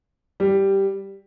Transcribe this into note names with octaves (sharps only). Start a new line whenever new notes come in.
G3